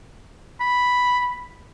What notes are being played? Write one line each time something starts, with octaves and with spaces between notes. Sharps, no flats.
B5